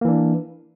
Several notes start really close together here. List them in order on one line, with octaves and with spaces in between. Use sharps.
A#3 E3 D4